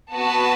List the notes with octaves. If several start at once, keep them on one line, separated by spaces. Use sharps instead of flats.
B3 F#4 B4 A5